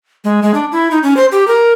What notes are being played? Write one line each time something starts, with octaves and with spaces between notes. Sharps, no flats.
G#3
G#3
D4
E4
D#4
C#4
C5
G4
A#4